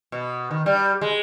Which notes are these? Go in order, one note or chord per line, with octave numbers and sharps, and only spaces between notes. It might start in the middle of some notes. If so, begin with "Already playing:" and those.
B2
D#3
G3
G#3